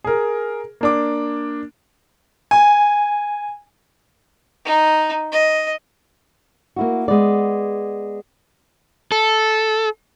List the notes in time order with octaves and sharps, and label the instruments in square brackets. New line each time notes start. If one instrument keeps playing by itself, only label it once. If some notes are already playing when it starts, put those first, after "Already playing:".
[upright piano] G#4 A#4
A#3 D4 D6
[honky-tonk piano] G#5
[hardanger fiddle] D#4
D#5
[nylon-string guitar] A#3 E4 F#4
G#3 B3 D5
[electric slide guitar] A4